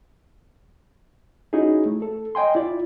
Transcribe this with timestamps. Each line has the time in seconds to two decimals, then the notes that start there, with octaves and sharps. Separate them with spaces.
1.53 C#4 D#4 E4 F#4 G#4
1.86 A3
2.02 A4
2.35 D#5 G5 G#5 C6
2.55 E4 F4 D5